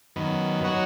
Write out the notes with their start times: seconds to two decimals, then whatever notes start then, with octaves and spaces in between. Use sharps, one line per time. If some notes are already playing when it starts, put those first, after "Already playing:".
0.16 F#2 D#3 B3
0.64 F#3 D#4 F#4 C#5